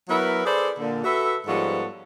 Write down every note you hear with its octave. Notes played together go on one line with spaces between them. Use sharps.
F#3 B3 E4 A#4 B4 E5
G#4 A4 B4 C5 D5
A#2 D3
F#4 A4 B4 E5
G#2 F3 G3 B3 A4 C#5